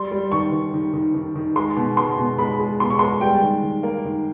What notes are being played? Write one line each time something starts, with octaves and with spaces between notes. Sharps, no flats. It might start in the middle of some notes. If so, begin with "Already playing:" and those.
Already playing: G3 C6
G3
D#3 C#6
D#3
D#3
D#3
D#3
D#3
G#3 C6
B2
G#3 C6
B2
G#3 B5
G#3
B2 C6
C#6
G#3 C6
G3 G5
D#3
D#3
A#3
D#3